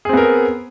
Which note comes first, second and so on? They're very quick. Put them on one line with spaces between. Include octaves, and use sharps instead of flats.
G#4 C4 B3 A#4